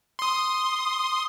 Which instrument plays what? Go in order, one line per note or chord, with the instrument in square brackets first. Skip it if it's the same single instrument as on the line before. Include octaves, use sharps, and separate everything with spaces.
[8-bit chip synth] C6 D#6